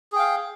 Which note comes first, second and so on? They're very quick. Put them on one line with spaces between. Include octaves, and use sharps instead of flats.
G#4 G5 F5